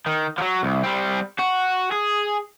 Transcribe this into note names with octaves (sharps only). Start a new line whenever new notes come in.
D#3
F3 F#3
C2
G3 C4
F#4
G#4